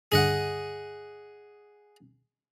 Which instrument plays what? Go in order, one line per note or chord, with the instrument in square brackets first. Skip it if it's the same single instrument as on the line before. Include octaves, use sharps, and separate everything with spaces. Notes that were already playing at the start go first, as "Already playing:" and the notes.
[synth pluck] C#2 G2 D3 [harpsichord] G#4 D#5 F#5